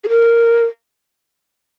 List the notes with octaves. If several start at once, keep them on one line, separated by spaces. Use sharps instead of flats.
G#4
A#4